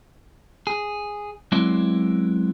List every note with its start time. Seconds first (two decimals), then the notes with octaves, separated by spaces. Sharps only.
0.67 G#4
1.52 F#3 G#3 B3 C4 E4 D5